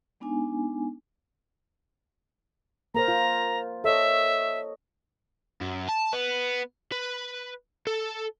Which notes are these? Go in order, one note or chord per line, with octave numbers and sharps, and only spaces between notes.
G#3 B3 D4 D#4 G#5
A#3 A#4 C5 A#5
F4
A4 C#5 D#5 E5
F#2
A5
B3
B4
A4